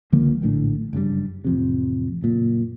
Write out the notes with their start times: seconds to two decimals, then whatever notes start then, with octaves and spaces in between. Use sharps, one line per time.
0.12 C#2 D3 F3 A#3
0.42 A#1 A2 D3
0.93 F#1 G2 B2 G3
1.44 A1 F2 C3
2.22 F#1 A#2